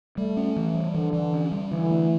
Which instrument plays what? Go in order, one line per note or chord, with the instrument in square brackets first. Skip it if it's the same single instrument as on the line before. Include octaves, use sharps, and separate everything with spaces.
[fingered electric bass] G3 [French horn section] A3
[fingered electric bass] C#4
E3
G3
[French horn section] D3 [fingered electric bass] E3
[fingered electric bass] E3
C#4
G3
[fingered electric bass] D3 [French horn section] E3
[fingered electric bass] A3